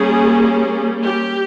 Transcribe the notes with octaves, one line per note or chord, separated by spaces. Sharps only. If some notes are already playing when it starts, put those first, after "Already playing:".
Already playing: G3 A#3 C#4 G#4
G4